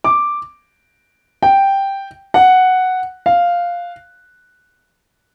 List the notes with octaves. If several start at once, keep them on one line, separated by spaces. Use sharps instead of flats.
D6
G5
F#5
F5